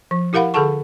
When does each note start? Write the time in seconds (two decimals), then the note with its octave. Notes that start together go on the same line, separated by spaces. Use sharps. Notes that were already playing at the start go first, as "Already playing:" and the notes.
0.11 F3
0.33 E4 G4 A#4 F5 F#5 B5
0.54 D3 G#4 A4 F#5 A5 C#6